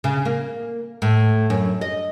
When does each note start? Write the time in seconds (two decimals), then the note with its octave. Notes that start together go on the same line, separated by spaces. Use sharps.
0.04 C#3
0.25 A#3
1.02 A2
1.50 F#2
1.81 D#5